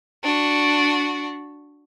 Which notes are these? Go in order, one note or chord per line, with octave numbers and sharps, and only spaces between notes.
D4 F#4